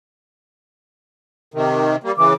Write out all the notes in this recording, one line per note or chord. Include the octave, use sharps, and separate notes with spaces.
C3 D#3
G3 A#3
C#3 E3 D6